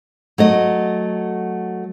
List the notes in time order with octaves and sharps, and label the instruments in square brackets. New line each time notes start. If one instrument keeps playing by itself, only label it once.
[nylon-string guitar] F#3 A3 D#5